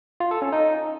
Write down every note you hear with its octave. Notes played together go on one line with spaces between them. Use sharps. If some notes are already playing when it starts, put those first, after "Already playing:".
F4
A4
C#4
D#4